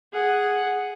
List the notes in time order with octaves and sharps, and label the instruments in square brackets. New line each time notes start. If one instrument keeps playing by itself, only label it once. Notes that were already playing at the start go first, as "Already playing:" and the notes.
[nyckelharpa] G#4 F#5